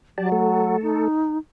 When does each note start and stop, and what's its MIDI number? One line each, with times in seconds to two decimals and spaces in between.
0.18 0.76 54
0.18 0.30 67
0.18 0.30 74
0.18 0.30 81
0.32 1.08 57
0.32 1.08 69
0.82 1.38 63